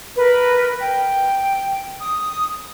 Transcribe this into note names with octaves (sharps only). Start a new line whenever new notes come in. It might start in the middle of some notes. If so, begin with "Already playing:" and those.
A#4 B4
G5
D#6